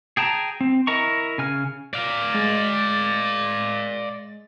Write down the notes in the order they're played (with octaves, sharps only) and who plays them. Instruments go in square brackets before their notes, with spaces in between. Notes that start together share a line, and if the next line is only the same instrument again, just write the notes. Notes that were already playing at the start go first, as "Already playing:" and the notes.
[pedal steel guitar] G#4 G5 A5 A#5
C4
E4 A#4 D#5 A#5 C#6
C#3 G#5 F6
[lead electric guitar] D5 F5
[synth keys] G#3 A6